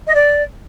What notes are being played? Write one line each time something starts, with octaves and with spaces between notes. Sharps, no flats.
D#5
D5